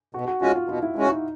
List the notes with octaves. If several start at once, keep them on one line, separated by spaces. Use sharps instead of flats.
B2 F#4
F#4
G#3 C#4 F4 F#4
F4
B2 F4
E4
G#3 C#4 F#4
D#4